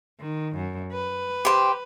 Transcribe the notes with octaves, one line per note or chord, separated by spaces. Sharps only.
D#3
F#2
B4
G4 C5